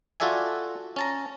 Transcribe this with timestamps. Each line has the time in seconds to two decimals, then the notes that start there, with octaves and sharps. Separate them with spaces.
0.20 F4 F#4 A4 D5 E5 G#5
0.96 C#4 A5 A#5